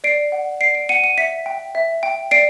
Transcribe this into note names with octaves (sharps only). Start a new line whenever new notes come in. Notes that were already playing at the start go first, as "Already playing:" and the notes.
D5 C7 D7
F#5
D5 C7 D7
C7 D7
F#5 C#7 D#7
C#7 D#7
E5 B6 C#7
G5
E5
G5
D5 C7 D7